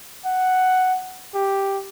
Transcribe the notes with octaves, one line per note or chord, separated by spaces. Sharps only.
F#5
G4